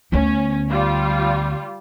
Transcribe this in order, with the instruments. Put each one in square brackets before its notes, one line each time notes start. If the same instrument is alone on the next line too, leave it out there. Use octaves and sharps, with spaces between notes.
[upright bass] D2 B3 [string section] C#4
[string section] G3 F4